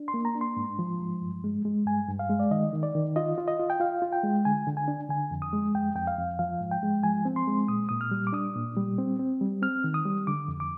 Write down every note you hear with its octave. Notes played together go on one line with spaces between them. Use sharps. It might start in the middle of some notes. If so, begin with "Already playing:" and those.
Already playing: D4
C6
A#3
A#5
D4
C6
G#2
F3
G#2
G2
G#3
G#3
G2 G#5
G2
F5
G#3
D5
D#3 D#5
D#3
D5
D#3
F4 D#5
F4
D#5
F4
G5
F4 F5
F4
G5
G#3
D3 G#5
D3
G#5
D4
D3 G#5
F2
D#6
G#3
F2 G5
F2 G5
F5
F2
F3 F5
G#2
G5
G#3
F3 G#5
C4
C6
G#3
A#2 D#6
A#2 D#6
F6
G3
D6
D4 D#6
A#2
G3
C4
C4
G3
C4 F6
D#3
D#6
G3
D3 D6
F2
D6